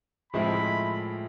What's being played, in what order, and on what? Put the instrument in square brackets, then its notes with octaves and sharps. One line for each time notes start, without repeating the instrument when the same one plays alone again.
[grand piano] A2 F3 G#3 C4 E4 [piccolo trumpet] B5